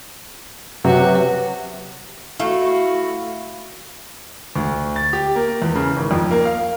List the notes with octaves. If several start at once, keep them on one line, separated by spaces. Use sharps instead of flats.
C3 F#3 F#4 B4 C#5 E5
A3 E4 F#4 F5
D2
A6
G4
A#3
E2
C#3
G#1
F2
A#3
F5